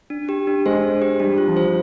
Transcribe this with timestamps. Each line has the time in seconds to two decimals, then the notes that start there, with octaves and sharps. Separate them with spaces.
0.10 D4
0.29 G4
0.47 D4
0.66 G#3 C5
0.83 D4
1.02 G4
1.20 G3 D4
1.38 F4
1.48 F3
1.57 C5